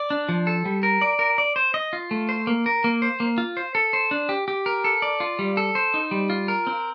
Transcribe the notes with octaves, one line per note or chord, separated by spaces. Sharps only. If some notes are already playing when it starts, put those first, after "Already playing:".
Already playing: D5
D4
F3
A4
G3
A#4
D5
A#4
D5
C5
D#5
F4
A3
C5
A#3
A#4
A#3
C5
A#3
F4
C5
A4
C5
D4
G4
G4
A#4
A4
D5
F4
G3
A4
C5
D#4
G3
F4
A#4
C4